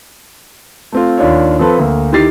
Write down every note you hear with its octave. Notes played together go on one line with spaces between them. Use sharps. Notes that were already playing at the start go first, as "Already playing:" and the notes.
A3 C4 F4
D#2 D4 F4 C#5
F3 C4 A4 B4
D2 A#3
D#3 E4 G4 A6 C7